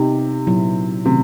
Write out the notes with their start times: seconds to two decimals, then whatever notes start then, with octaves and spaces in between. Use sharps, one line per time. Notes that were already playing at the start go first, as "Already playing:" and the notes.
Already playing: C3 B3 D#4 G4
0.47 A#2 F#3 B3 E4
1.05 C3 D#3 F#3 A3 C#4 F#4